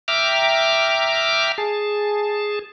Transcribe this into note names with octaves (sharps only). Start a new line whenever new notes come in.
E5 G5 A#5 D6 F6
G#4 A5